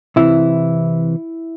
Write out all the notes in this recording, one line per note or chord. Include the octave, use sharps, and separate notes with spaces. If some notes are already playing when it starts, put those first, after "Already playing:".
C3 E3 E4